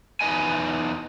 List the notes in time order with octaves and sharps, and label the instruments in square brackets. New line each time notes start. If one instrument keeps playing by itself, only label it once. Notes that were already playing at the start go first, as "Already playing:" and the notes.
[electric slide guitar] E2 D#4 B4 D#5 G#5